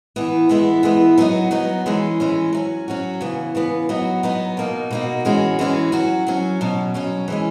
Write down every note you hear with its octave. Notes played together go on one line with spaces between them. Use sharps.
E3 B3 E4
E3 G#3 B3 E4
E3 G#3 B3 E4
F#3 B3 D#4 F#4
F#3 B3 D#4 F#4
E3 G#3 C#4
E3 G#3 C#4
F#3 C#4 F#4
F#3 C#4 F#4
C#3 E3 B3
C#3 E3 B3
F#3 B3 D#4 F#4
F#3 B3 D#4 F#4
B2 A#3 D#4 F#4
B2 A#3 D#4 F#4
E3 G#3 C#4 F#4
E3 G#3 C#4 F#4
F#3 C#4 F#4
F#3 C#4 F#4
B2 F#3 C#4
B2 F#3 C#4
E3 G#3 C#4